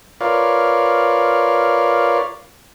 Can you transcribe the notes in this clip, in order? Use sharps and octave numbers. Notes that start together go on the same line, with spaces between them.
F4 A#4 B4 C#5 D5 F5